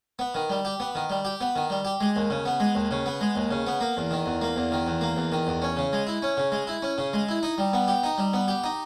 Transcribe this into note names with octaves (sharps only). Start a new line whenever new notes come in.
B3
D#3
G3
G4
B3
D#3
G3
G4
B3
D#3
G3
G4
G#3
D#2
C#3
B3
G#3
D#2
C#3
B3
G#3
D#2
C#3
B3
A#3
E2
D#3
E2
A#3
E2
D#3
E2
A#3
E2
D#3
E2
C#4
C#3
G#3
E4
C#4
C#3
G#3
E4
C#4
C#3
G#3
E4
D#4
G3
B3
G4
D#4
G3
B3
G4
D#4